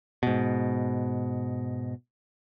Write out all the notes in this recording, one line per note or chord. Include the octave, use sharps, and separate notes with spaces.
G#2 B2